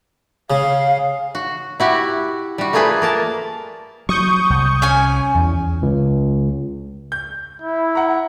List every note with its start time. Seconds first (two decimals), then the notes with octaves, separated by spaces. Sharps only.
0.50 C#3 F5
1.35 F#4
1.80 E4 F#4 G4
2.58 G3 F#4
2.73 A3 A#3 F4 G#4 B4
3.02 A#3 A#4 A5
4.09 F#3 C#6 D#6 G6
4.50 C2
4.82 C#4 G#5
5.35 E2
5.82 C#2
7.12 G6
7.62 E4
7.95 F#5 A#5